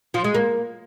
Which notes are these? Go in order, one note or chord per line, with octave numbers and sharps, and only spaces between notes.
F3
G#3
A#3